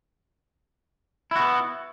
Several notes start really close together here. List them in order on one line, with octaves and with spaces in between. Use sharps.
E4 F#4 B3